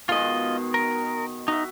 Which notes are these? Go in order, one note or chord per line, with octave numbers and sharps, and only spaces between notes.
B2 D#3 G#3 F4 D#5
A#4
D#4 F#4 E5